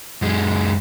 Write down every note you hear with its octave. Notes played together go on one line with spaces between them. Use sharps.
F#2 G#3